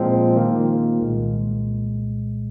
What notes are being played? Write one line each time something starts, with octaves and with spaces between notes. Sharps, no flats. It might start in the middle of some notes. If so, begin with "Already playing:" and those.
Already playing: A#2 F3 G#3 C4
D#3 A#3 F4
C2 A#2 G#3